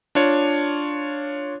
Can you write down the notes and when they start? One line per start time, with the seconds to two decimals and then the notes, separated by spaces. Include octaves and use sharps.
0.15 D4 F4 C#5